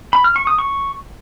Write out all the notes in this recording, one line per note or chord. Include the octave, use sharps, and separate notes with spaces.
B5
F6
C#6
D#6
C#6